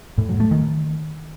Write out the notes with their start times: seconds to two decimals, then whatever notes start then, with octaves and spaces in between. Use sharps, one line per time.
0.18 A2
0.29 F#3
0.40 A3
0.51 D#3